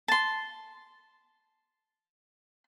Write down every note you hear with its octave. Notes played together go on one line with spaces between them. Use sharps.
A5 C6